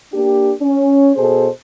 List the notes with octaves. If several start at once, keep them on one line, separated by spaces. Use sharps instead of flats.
A#3 D4 G4
C#4
B2 G#4 A4 C5